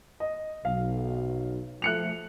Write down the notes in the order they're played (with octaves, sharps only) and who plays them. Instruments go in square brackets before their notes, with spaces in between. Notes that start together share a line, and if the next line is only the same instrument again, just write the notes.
[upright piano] D#5
[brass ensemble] B1 [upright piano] F5
[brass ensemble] F3 A3 [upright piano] F#6 C#7 F7